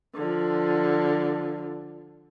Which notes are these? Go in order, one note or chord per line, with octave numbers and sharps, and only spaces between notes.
D3 F3